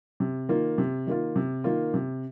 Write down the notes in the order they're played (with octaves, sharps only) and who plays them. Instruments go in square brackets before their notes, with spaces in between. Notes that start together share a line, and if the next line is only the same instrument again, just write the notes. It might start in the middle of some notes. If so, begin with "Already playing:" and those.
[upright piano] C3
D#3 A#3 F4
C3
D#3 A#3 F4
C3
D#3 A#3 F4
C3